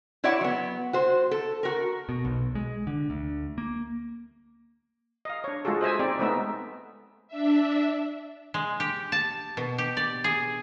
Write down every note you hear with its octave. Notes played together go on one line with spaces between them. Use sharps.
E4 F#4 C#5 D5 E5 F#5
F#3 B3
F#4 C5
A4
F#4 A#4
B2
B1
G#3
D3
D2
A#3
D#5 F5
D4 C#5
G#3 F4 F#4 G#4 A4
C5 D#5 E5 G#5
C4 D#4 G4 D5
G#3 A3 B3 D#4 B4 E5
D4 E5
G#3
G4
A5
B2
G4
D5
G#4